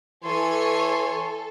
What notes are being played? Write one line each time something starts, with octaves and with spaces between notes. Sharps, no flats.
E3 A4 C#5 G#5 C6